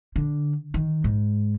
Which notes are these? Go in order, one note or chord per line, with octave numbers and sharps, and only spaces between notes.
D3
D#3
G#2